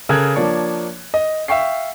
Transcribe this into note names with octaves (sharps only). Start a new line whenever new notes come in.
C#3 A4 A#4 G#5 F#6 G#6
F3 A#3 D4 C#5
D#5
E5 F5 G5 C#6 C7